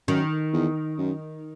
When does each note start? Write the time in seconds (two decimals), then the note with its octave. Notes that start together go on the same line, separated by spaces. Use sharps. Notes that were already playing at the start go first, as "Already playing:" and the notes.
0.08 F#2 D#3
0.53 E2
0.98 F#2